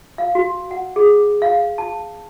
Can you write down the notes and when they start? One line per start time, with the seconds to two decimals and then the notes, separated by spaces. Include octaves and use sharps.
0.18 F5
0.35 F#4
0.71 F#5
0.96 G#4
1.42 F5
1.78 A5